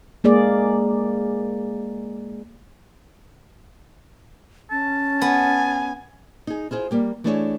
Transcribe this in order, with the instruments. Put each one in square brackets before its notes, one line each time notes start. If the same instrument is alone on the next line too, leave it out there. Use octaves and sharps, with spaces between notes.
[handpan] G#3 A#3 G#4 D5
[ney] C#4 [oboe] A5
[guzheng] B3 [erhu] G#5
[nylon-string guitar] D#4 G#4
E4 F4 G#4 C5
G3 A#3 G4
E3 A3 D4 E4 G#4 C#5